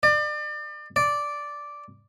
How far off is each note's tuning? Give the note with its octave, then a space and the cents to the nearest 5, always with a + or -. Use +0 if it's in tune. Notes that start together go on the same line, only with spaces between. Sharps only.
D5 +35
D5 -5